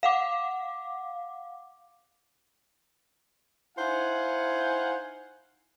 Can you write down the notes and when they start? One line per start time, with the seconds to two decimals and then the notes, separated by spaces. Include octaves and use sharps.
0.03 F5 F#5 D6
3.77 D#4 E4 C5 F5 F#5 G#5